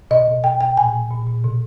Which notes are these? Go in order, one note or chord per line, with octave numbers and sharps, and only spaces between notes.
B2 D#5
B2
B2 G5
B2 G5
A#2 G#5
A#2
A#2
A#2
B2